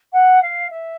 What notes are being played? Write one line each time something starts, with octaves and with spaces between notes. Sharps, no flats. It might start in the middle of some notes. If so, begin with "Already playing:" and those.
F#5
F5
E5